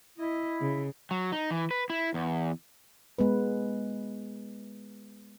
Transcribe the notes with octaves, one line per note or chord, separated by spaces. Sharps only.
E4 D#5
C#3
F#3
D#4
E3
B4
E4
E2
G#3 B3 B4